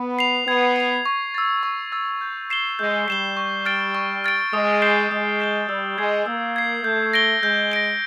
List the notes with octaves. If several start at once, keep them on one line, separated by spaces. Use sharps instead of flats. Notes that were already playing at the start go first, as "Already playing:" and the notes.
Already playing: B3
C7 F7
B3 G#6
C7 F7
C#6
E6 A6
C#6
E6 A6
G6
C7 E7 G7
G#3 G6
G3 C7 E7 G7
C#6
F6 A6 D7
C#6
F6 A6 D7
G#3 D#6
G6 C7 E7 G7
G#3 D#6
G6 C7 E7 G7
G3 E6
G#3 G#6 C7
A#3 E6
G#6 C7
A3 G6
A#6 D7 G7
G#3 G6
A#6 D7 G7